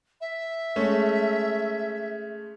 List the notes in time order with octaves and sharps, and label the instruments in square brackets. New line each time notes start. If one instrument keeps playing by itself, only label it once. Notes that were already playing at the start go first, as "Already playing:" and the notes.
[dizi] E5
[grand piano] G#3 A3 C#4